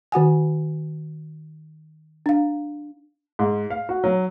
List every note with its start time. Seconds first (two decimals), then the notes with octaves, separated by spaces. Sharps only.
0.12 D#3 F#4 F#5 G#5
2.26 D4 F5
3.39 G#2
3.70 F5
3.89 F#4
4.04 F#3